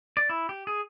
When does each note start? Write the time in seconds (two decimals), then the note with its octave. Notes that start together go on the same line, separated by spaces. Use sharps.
0.17 D5
0.29 E4
0.49 G4
0.67 G#4